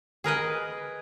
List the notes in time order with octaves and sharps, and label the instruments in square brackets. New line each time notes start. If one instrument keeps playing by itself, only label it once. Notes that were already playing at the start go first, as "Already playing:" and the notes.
[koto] G#4 A#4 B4 D#5